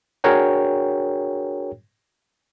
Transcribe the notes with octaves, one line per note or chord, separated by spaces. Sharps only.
D4 F#4 G#4 A#4 C#5 G5